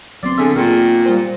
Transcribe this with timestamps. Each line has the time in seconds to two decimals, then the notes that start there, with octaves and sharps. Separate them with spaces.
0.23 F#3 B3 C4 D5 C6
0.38 D3 G#4 E5
0.55 A#2 D#3
1.05 G3 C5